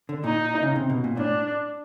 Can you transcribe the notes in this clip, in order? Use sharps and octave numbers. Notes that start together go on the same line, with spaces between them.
D3
A#2 D#4
C#3
C3
B2
A#2
A2 D4